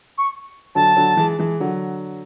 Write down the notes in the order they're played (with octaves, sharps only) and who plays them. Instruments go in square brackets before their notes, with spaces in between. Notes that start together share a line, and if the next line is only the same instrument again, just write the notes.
[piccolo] C#6
[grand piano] D3 F#3 [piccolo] A5
[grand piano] D3 F#3
E3 G#3
E3 G#3
D3 F#3